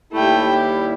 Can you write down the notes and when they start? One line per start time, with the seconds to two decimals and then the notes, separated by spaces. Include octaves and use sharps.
0.13 D#2 G3 A3 E4 G5
0.54 G4